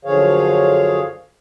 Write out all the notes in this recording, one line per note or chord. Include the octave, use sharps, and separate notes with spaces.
F#2 D3 F3 G#4 C#5 F5